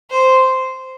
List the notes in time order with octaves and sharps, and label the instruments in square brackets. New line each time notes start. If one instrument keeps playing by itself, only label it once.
[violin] C5